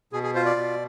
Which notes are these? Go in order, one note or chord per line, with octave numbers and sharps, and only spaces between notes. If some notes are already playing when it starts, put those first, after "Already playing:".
B2 G#4
G#4
F4 C5
D5
B2